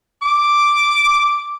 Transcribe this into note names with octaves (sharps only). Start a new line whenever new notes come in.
D6